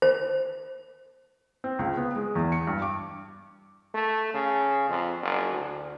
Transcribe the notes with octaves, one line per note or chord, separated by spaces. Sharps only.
C5
C4
C#2
B3
G#3
E2
C#7
G2
D6
A3
C#3
F2
F#1
D2